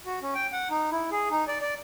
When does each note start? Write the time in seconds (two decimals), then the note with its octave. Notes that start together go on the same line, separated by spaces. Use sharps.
0.06 F#4
0.22 C#4
0.35 G5
0.53 F#5
0.70 D#4
0.92 E4
1.11 G#4
1.31 D#4
1.48 D5
1.62 D5